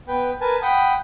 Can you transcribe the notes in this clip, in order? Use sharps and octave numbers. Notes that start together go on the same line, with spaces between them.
B3 B4 G5
A#4 B4 G#5 A5
F#5 G5 B5 D#6